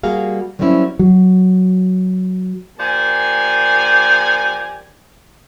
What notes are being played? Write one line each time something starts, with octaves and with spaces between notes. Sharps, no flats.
G3 A#3 F#4 G#4 F5
F#3 G3 A#3 C4 C#4 E4
F#3
F3 A#3 G4 D5 G#5